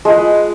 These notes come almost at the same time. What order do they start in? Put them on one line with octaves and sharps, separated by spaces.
G#3 F4 B4